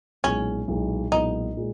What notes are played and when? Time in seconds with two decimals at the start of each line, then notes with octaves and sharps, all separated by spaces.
0.24 B1 A#2 G#3 B3 C#4 E4
0.68 B1 A#2 G#3 B3 E4
1.12 B1 A#2 G#3 B3 D#4 E4
1.57 A#2 G#3